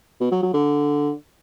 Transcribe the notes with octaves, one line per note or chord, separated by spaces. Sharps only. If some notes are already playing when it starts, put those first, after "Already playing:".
B2
F#3
F#3
D3